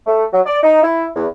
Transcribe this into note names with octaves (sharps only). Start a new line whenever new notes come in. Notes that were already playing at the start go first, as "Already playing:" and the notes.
A3
F#3
D5
D#4
E4
E2